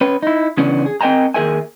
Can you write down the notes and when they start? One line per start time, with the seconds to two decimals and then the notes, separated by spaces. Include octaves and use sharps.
0.01 C#4 B4
0.23 D#4 E4
0.57 C#3 E3 B3 C#4 D4
0.86 G#4
1.01 C4 A#4 D#5 G5 G#5 A#5
1.34 D#2 G#4 A#4 E5 G#5